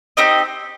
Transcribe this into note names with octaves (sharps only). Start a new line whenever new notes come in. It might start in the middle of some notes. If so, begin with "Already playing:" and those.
C4 D#4 G4 D#5